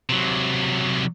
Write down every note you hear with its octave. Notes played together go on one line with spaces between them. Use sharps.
C3 F#3